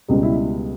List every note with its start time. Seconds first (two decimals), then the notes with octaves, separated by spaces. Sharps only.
0.08 C#2 B2 G3
0.23 E4